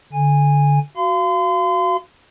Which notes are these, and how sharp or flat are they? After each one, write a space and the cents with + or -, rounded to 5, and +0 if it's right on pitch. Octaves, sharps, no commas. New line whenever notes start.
D3 -20 G#5 -15
F#4 +0 F5 -20 C6 -40